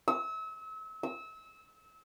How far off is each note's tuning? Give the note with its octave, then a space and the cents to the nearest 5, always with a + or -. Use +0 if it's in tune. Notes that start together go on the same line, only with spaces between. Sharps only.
E6 -35
E6 -20